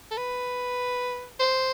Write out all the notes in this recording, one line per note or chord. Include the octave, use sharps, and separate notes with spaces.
A4
B4
C5